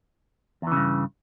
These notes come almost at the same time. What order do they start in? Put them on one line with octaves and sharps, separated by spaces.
E2 E3 C#3 G2